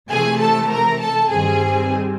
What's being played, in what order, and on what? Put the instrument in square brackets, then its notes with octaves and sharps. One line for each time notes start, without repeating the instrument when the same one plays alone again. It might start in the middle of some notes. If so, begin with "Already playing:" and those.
[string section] C3 E3 A3 G#4 G#5
A4 A5
A#4 A#5
A4 A5
G2 D#3 G3 C4 G#4 G#5